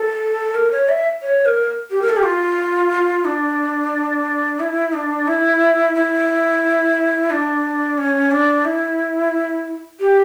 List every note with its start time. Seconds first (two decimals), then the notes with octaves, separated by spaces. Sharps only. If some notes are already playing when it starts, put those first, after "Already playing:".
Already playing: A4
0.55 A#4
0.71 C#5
0.89 E5
1.22 C#5
1.46 A#4
1.91 G4
2.02 A#4
2.09 A4
2.17 G4
2.23 F4
3.25 D4
4.60 E4
4.93 D4
5.28 E4
5.95 E4
7.30 D4
7.98 C#4
8.31 D4
8.65 E4
10.00 G4